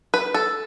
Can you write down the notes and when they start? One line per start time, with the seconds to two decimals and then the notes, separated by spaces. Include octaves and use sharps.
0.14 B4
0.34 A4